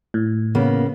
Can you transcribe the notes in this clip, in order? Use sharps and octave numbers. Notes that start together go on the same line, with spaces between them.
A2
C#3 A#3 B3